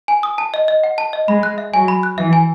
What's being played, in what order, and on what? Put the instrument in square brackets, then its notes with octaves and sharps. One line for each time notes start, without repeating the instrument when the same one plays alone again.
[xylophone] G#5
D#6
A5
D#5
D#5
F#5
A5
D#5
[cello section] G#3 [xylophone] B5
[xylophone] F#6
E5
[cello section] F#3 [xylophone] G#5
[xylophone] B5
F#6
[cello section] E3 [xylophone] E5
[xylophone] G#5